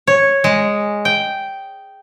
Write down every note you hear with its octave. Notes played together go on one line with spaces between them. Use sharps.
C#5
G#3
G5